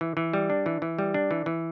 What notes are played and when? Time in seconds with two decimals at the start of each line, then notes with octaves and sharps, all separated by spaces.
0.01 E3
0.17 E3
0.33 G3
0.50 D4
0.66 E3
0.82 E3
0.99 G3
1.14 D4
1.31 E3
1.46 E3